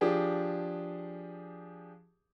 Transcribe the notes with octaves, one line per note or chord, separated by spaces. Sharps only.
F3 D4 G4 G#4